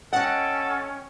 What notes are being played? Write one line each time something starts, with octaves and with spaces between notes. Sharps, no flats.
C#4 A4 D#5 F#5 G5